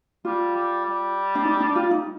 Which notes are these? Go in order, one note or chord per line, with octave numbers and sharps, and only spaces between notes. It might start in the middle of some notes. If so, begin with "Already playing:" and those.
G3 F4
G3
G3
D4
D#4
D4
F4
D#4